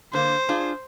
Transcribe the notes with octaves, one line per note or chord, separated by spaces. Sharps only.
D3 A#3 C5
D4 F4 G#4